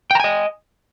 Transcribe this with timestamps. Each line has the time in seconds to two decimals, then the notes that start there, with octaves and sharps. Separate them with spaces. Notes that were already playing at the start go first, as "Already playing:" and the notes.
0.11 G5
0.15 A#5
0.20 G#5
0.24 D#5